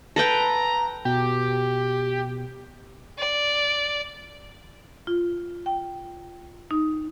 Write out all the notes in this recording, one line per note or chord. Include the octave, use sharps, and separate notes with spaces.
A4 B4 G5 A#5
B2 G4
D5
F4
G5
D#4